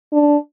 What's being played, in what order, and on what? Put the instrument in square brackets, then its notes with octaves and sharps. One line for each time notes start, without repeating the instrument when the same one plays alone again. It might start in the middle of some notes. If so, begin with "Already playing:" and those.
[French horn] D4